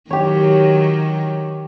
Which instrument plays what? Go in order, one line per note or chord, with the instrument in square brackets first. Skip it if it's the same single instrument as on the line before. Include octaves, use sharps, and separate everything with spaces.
[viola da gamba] D#3 F#3 [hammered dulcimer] G4 C#5